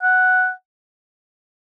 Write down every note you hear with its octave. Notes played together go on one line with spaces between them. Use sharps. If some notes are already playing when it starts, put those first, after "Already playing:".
F#5